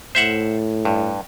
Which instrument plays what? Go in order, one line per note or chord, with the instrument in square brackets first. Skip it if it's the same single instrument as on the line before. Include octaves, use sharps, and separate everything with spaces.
[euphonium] A2 [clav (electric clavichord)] C5 E5 F#5
[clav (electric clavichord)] G2